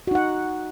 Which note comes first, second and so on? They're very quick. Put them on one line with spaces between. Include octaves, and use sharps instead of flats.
F#4 D#4 F#5